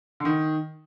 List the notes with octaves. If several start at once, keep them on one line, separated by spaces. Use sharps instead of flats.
D3
D#3